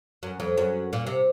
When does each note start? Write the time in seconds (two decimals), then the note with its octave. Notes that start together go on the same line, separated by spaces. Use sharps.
0.23 F#2
0.40 F2
0.58 F#2
0.93 A#2
1.07 C3